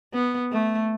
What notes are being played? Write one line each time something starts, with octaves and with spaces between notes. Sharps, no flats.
B3
A3